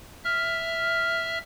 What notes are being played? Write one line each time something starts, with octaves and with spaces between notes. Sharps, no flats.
E5 F6